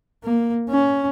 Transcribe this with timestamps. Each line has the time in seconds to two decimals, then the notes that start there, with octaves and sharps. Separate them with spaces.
0.24 A#3
0.69 C#4